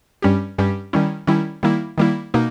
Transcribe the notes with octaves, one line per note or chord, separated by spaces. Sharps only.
G2 G3 C#4 G4
G2 G3 C#4 G4
D#3 G3 C#4 E4
D#3 G3 C#4 E4
D#3 G3 A#3 E4
D#3 G3 A#3 E4
B2 A#3 D#4